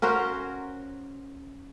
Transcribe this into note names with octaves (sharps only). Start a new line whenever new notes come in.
C#4 F#4 A#4 C5